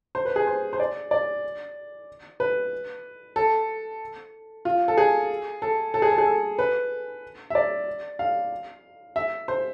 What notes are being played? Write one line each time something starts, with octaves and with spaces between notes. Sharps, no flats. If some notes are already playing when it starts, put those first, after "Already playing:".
C5
B4
G#4
C5
C5
D5
D5
B4
A4
F4
A4
G#4
A4
A4
G#4
A4
G#4
A4
B4
E5
D5
F5
E5
C5